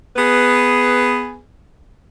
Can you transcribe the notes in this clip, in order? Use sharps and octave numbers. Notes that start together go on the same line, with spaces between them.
B3 G#4 B4